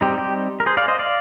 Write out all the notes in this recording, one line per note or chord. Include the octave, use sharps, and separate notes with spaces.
G3 C4 D#4 G4
G4
A#4
G#4 C5
D5 F5
C5 D#5
D5 F5